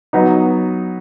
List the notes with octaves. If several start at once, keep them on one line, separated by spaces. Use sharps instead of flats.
F#3 B3 D#4